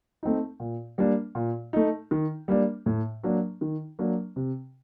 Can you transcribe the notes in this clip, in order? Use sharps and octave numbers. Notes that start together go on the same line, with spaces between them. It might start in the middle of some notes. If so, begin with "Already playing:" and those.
A3 C4 D#4
A#2
G3 A#3 D4
A#2
A3 D#4
D#3
G3 A#3 D4
A2
F#3 A#3 D4
D#3
F#3 A#3 D4
C3